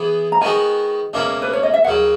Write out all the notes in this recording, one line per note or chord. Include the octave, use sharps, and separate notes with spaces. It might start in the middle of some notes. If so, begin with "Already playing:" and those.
Already playing: E3 B3 E4 G#4
A#5
D#3 G#3 B3 F#4 G#5
C#2 B2 A#3 C#4 E4
B4
C#5
D#5
E5
D#2 C#3 F#3 F#5